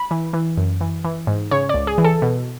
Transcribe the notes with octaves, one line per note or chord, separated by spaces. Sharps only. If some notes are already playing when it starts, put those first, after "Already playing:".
Already playing: B5
E3
E3
F#2
E3
E3
G#2
C#3 C#5
C#2 D5
G#4
E3
A4
B2